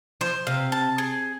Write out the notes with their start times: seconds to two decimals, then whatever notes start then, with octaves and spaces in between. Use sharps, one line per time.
0.21 F3 C5
0.47 C3 F5
0.72 A5
0.98 G#4